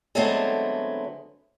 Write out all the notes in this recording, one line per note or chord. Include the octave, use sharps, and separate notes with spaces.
D3 F#3 G#3 A3 B3 C4